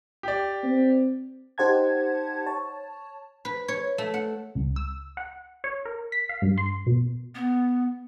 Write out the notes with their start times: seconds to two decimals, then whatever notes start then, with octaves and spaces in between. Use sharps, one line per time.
0.23 G4 D5
0.63 C4
1.58 D#4 G4 C5 F#5 A5 G#6
2.46 C#5 A5
3.45 B4
3.68 C#5
3.98 A3
4.14 F#5
4.55 C#2
4.76 E6
5.17 F#5
5.64 C#5
5.86 A#4
6.12 B6
6.29 F5
6.42 G2
6.58 C6
6.86 B2
7.35 B3